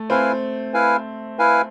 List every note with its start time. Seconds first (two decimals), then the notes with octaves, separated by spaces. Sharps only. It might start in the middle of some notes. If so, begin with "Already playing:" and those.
Already playing: A3
0.10 C4 E4 B4 F5 G#5
0.74 E4 B4 F5 G#5
1.39 E4 B4 F5 G#5